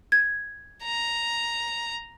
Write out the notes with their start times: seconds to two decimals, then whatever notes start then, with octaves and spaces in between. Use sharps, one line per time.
0.12 G#6
0.83 A#5